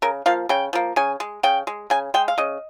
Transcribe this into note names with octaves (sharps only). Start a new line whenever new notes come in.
C#3 A#4
F3 A#3 F5
C#3 G5
F3 A#3
C#3 G#5
G#3
C#3 G5
G#3
C#3 G#5
G#3 G5
F5
C#3 D#5